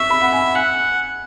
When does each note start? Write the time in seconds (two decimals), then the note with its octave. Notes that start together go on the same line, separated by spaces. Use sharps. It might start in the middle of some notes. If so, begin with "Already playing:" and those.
Already playing: E5 C#6 E6
0.10 B5
0.21 F#5
0.33 G#5
0.55 F#5 G#5